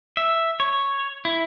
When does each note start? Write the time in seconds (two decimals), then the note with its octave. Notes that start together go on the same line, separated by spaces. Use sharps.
0.17 E5
0.60 C#5
1.25 E4